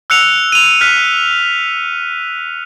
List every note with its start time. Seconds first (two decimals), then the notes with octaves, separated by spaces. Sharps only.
0.10 E6 F#6 C#7 F7
0.52 D#7 F7
0.81 F6 F#6 B6